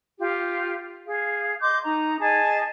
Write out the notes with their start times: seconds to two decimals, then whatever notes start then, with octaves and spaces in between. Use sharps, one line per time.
0.19 F4 G4
1.06 G#4 F5
1.60 D#5 C6 D6 G6
1.84 D#4 A#5
2.19 G#4 D#5 G#5 A5